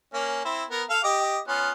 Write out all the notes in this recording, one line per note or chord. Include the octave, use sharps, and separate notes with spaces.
A#3 C#4
C4 E4
B3 A#4
A4 F5
G4 D#5 D6
B3 C#4 F4